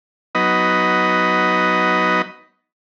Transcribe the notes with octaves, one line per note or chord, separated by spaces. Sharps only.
F#3 B3 D#4 B4 D#5